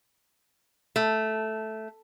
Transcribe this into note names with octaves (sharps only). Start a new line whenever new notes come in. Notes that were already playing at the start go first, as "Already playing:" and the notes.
A3